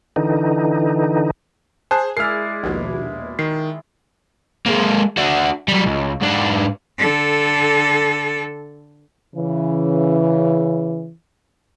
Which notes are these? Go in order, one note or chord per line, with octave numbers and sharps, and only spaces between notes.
D3 E3 D#4
G#4 C5 G#5 A5 F#6
G#3 E4 A#4 D5 F6 C7
A#1 D#2 B2
D#3 C7
G#3 A#3
D4 F#4
F#3 G3
C#2
G#2 D4
D3 A4
C#3 E3